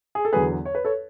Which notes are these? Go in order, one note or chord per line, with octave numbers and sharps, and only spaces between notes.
G#4
A4
E2 D3 F#3 B3 G#4 B4
C#5
B4
A4 C#5